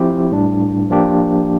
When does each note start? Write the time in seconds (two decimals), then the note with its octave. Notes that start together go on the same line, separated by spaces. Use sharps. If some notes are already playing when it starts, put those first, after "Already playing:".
Already playing: F3 C4 E4 G4
0.31 A2 G3 D4
0.90 F3 A#3 D4 G4